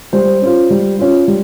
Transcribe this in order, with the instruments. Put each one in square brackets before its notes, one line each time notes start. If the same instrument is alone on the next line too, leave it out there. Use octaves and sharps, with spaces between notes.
[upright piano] G3 C5
C#4 F4
G3
C#4 F4
G3